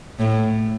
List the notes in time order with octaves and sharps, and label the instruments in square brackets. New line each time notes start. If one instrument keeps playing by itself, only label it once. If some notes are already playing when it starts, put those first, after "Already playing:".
[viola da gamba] A2